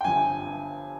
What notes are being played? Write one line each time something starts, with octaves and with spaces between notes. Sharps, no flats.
G5
G1 G2 F3 G#5